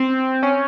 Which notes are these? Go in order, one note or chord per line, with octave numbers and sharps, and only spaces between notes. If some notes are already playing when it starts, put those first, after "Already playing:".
Already playing: C4
C#4